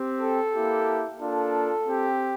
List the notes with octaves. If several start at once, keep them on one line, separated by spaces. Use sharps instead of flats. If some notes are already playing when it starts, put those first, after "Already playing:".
Already playing: C4 G4
A4
A#3 E4 G4
A#3 D4 F4 A4
C4 G4